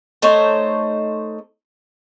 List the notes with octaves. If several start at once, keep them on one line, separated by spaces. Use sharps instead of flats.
A3 D#4 C5 C#5